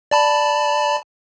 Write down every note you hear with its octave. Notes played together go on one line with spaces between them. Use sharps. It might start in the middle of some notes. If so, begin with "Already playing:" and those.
D5 A5 B5